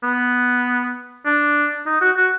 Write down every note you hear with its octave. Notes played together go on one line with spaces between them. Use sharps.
B3
D4
D#4
F#4
F#4